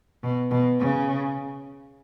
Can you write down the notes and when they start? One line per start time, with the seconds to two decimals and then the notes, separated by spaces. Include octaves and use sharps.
0.23 B2
0.51 B2
0.80 C#3